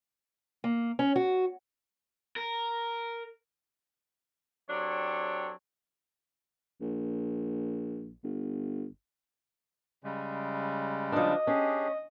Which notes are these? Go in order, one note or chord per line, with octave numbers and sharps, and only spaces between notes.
A#3
C#4
F#4
A#4
F#3 C4 D4 G4 A4 C#5
A#1
G1
C#3 G3 G#3
F3 D4 D#5
C#4 D4 G4 G#4